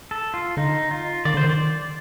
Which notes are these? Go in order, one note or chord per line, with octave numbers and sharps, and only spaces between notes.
A4
F4
D3 D#4
F4
D#3 D5
D3 C5
D#3
D5